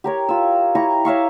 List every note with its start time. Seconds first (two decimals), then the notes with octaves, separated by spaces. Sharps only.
0.04 G4 A#4 C#5
0.29 F4 E6
0.75 E4 G4 A#5 C#6
1.05 C#5 E5 F5 C#6